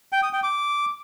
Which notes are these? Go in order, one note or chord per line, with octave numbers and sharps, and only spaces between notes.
G5
D#6
G5
D6